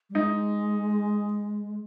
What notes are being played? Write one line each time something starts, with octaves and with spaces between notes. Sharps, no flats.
G3
G#3 D#4